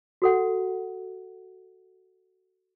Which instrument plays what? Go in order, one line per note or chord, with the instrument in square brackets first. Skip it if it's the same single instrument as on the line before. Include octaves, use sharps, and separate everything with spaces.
[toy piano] F#4 A4 F#5